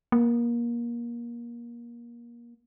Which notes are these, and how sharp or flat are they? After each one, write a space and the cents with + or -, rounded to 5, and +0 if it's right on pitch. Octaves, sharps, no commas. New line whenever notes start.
A#3 +25